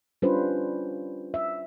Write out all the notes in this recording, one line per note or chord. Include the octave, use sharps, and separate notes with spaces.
G3 C#4 D4 F4 B4 C5
E5